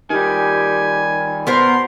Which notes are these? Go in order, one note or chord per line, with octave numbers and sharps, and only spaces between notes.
D#3 G3 G4 G#5
B2 B3 A#4 C5 C6